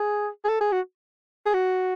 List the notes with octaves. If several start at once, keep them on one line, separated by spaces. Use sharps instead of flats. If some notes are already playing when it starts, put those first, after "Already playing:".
Already playing: G#4
G#4
A4
G#4
F#4
G#4
F#4